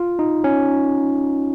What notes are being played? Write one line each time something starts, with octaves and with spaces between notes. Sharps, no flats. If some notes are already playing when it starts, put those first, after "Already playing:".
Already playing: F4
D#4
C#4